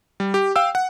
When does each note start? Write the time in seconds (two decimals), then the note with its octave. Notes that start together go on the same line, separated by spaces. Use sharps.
0.20 G3
0.34 G4
0.56 F5 G5 E6
0.75 F#5